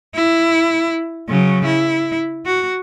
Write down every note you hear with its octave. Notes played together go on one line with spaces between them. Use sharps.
E4
C#3 F#3
E4
F#4